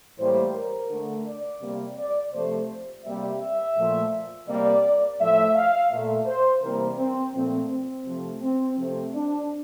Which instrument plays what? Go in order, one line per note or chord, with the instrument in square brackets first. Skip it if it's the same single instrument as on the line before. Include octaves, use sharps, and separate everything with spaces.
[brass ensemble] A2 E3 G3 A#3 C5
A#4
D3 A3
D5
C3 G3 A#3
D5
C3 F3 A3 C5
C3 G3 A#3 E5
E5
A#2 F3 A3
C3 G3 A#3 D5
A2 F3 A3 E5
F5
A#2 A3 E5
C5
C3 E3 G3 A#3 A#4
C4
A#2 F3 A3 C4
C4
C3 F3 A3
C4
C3 F3 A3 C4
D4